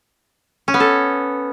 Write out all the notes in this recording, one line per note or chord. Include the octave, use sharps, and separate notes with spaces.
C#4
B3
A4